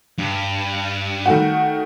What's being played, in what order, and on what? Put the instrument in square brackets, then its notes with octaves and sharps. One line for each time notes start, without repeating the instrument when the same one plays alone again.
[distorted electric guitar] G2
[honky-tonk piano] D#3 A3 F#4